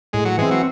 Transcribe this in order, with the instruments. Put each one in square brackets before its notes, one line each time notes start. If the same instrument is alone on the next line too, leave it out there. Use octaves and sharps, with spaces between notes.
[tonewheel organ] A2 [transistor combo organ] G#3
[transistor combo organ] F#3
[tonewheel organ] E3 C4 [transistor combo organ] G#3
[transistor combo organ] F#3